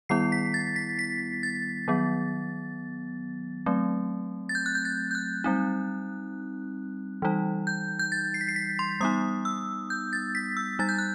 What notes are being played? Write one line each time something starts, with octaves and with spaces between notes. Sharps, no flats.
D#3 G3 B3 E4 C7
B6
A6
B6
B6
A6
D#3 F#3 B3
F#3 A3 C4
A6
G6
F#6
G6
A6
G6
F#6
G3 C4 D#4
E3 G3 D#4
G6
G6
A6
C7
B6
C7
B6
C6
G3 B3 D#4 D#6
E6
G6
A6
B6
E6
G3 D#4 A6
G6
F#6